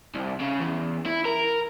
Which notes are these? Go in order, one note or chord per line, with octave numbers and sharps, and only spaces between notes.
C2
C#3
E2
E4
A#4